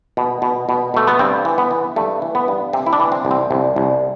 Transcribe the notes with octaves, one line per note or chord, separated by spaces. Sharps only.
B2
B2
B2
B2 A3
B3
G2 C4
E3
B3
E3
G2 A3
E3
B3
G2
C3 C4
E4
D4
E3
C4
C2
C4
C2
C2